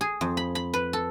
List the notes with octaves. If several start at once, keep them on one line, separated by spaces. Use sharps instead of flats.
G#4
F2
B5
B5
B4
A4